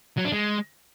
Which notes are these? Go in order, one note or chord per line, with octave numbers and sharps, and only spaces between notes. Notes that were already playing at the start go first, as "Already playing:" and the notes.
F#3
D4
G#3